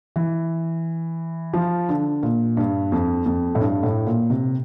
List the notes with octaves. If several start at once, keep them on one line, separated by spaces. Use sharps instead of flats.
E3
F3
D3
A#2
G2
F2
F2
A2
G2
A2
A#2
C3